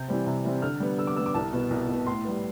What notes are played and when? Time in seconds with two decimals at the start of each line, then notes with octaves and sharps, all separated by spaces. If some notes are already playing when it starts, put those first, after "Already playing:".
Already playing: C3 G6
0.08 E3 G3 C4
0.26 C3
0.44 E3 G3 C4
0.62 D3 F6
0.80 G3 B3
0.98 D3 E6
1.07 D6
1.16 G3 B3 E6
1.26 D6
1.34 C2 A5
1.53 B2 B3
1.70 C2
1.89 B2 B3
2.06 A2 C6
2.25 G3 B3